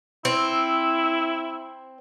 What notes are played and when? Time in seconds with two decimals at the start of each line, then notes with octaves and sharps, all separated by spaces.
0.25 C4 E4